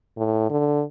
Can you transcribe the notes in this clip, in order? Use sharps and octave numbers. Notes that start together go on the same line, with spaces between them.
A2
D3